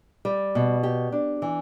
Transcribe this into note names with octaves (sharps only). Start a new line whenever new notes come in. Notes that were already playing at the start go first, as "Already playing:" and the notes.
G3
B2
G4
D4
E3